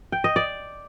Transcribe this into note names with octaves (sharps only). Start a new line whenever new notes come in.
G5
D#5
D5